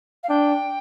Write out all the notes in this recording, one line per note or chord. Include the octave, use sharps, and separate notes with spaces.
F5
D4 G5